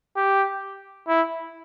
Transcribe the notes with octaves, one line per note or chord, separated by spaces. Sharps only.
G4
E4